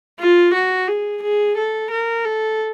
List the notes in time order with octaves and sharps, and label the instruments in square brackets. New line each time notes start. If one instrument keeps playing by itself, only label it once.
[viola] F4
F#4
G#4
G#4
A4
A#4
A4